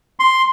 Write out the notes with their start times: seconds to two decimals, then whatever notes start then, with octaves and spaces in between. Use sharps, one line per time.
0.20 C6